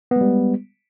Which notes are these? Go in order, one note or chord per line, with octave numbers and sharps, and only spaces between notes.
G3 G#3 B3